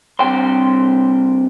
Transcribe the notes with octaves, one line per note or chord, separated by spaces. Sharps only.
G2 C3 G5 C6